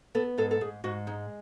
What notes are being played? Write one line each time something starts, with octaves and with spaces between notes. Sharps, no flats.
B3 A4
G#2 A4
A4
G#2 G#4
G#2 F#4
G#3 D#4